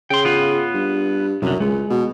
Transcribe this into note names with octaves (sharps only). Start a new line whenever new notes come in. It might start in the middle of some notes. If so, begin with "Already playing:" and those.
C#3 G5 C6
B3 F4
G2
C2 F#2 D3
C#2 G#3
B2